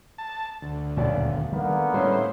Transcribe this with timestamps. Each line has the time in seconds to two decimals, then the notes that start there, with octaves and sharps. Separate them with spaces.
0.18 A5
0.62 D2
0.97 D#1 B1 F#2 D5
1.52 D3 D#3 G3 A#3 B3
1.94 A2 G3 C#4 E4 C5